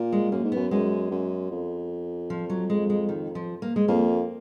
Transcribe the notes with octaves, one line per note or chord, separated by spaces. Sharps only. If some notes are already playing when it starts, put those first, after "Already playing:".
Already playing: A#2
G#3
F#2 A#3
G#2
F#2 B3
F#2 G#3
F#2
F2
F3
F#3
G#3
G#3
D#3
F3
A#3
G#3
F2 A#3